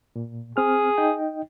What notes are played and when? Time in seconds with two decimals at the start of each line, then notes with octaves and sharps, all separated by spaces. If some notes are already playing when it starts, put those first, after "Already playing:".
0.16 A#2
0.57 C4 G#4 F6
0.98 D#4 D#5 G5